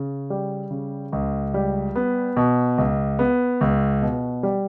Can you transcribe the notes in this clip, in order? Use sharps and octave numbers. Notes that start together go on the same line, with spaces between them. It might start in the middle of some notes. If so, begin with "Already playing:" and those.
Already playing: C#3
G3
C#3
C#2
G3
B3
B2
C#2
B3
C#2
B2
G3